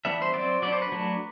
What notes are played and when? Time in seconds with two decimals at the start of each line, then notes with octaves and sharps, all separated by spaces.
0.05 E3 G3 B3 D4 E5
0.22 C5
0.33 F#3 C4 D5
0.62 F#3 B3 D4 D5
0.72 C5
0.82 B4
0.92 F#3 A3 D4